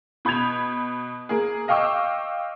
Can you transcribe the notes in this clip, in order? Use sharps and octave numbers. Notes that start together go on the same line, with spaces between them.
B2 B5 G6 G#6 F7
A#3 G#4
D#5 F5 G5 C#6 D6 E6